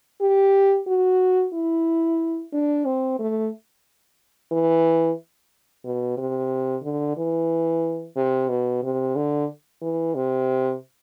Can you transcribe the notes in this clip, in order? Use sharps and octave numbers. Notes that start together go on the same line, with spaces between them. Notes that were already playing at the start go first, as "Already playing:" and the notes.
G4
F#4
E4
D4
C4
A3
E3
B2
C3
D3
E3
C3
B2
C3
D3
E3
C3